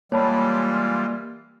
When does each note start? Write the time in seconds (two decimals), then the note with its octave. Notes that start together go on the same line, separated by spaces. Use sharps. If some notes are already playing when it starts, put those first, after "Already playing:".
0.12 E3 G3 G#3 A#3 F4 C#5 A5 B5
0.74 F6